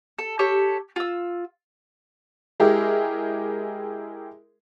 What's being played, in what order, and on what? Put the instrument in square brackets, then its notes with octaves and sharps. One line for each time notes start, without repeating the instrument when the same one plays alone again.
[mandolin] A4
G4 A4 C#5
F4 E6
[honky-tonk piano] G#3 E4 G4 G#4 A#4